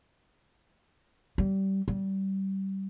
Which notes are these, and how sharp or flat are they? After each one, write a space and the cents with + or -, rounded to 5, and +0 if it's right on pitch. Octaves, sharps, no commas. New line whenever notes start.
G3 -25
G3 -25